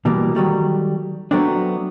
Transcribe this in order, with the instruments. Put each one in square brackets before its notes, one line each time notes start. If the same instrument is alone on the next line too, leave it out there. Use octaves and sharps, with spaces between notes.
[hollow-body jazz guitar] B2 E3 G3 A#3
D#3 F#3 G3 A3
F#3 A3 B3 C4 D4